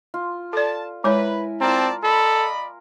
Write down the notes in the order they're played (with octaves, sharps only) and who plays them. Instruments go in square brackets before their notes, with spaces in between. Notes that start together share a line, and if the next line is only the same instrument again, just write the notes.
[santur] F4
[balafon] A4 D5 [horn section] A5
[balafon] G#3 C#5 [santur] E4 A#4 G#5 [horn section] B4
[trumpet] C4 [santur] F4 A#4 A#5 [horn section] D5 A5
[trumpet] A4 [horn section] D5 D#5 B5